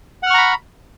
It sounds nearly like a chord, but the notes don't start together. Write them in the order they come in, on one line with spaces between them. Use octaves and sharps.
F#5 F6 C#6 A#5 B5